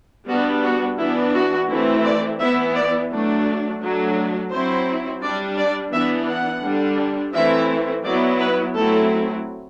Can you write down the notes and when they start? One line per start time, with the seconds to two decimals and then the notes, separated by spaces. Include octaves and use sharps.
0.29 G3 B3 D4 F#4
0.64 F#4
0.99 E3 B3 D4 E4
1.34 F#4
1.70 E3 A3 C4 E4
2.05 D5
2.40 E3 B3 E4 E5
2.75 D5
3.11 F#3 A3 D4
3.81 F#3 A3 D4
4.52 F#3 C4 E4 C5
5.22 G3 D4 D5
5.57 D5
5.93 E3 B3 D4 E5
6.28 F#5
6.63 D3 G3 D4
7.34 E3 A3 C4 E4 E5
8.04 F#3 B3 E4 D5
8.40 B4
8.75 F#3 A3 C4 E4 A4